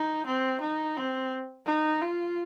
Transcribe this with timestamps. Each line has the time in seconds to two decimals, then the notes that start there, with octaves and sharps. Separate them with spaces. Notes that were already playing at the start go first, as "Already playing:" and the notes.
Already playing: D#4
0.27 C4
0.61 D#4
0.97 C4
1.66 D#4
2.02 F4